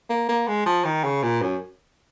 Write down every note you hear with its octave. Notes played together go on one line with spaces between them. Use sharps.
A#3
A#3
G#3
F3
D#3
C#3
A#2
F#2